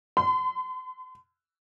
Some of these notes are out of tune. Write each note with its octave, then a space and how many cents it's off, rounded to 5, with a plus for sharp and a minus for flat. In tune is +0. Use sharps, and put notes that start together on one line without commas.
C6 -45